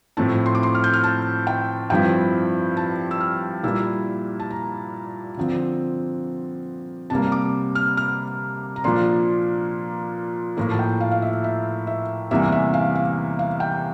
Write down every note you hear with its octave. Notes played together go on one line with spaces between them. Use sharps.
A2 F3 A3 C4 E4 A5
C6
D6
C6
F6
G6
F6
A5
G5
G2 F3 C4 E4 G5
A5
E6
F6
A#2 G3 A#3 E4 E6
A5
A#5
D3 F3 C4
C3 G3 A#3 A5
D6
F6
F6
A#5
A#2 F3 A#3 D4 C6
A2 F3 A#3 E4 A#5
A5
G5
F5
F5
E5
E5
E5
E2 C3 E3 G3 A#3 E5
E5
F5
F5
F5
G5